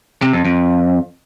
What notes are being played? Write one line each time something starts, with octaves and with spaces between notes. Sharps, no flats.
C3
F2
F2